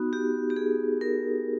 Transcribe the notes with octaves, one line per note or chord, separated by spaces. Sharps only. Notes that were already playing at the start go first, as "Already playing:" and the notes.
Already playing: B3 D#4 F#4
G4
G4
G#4
A#4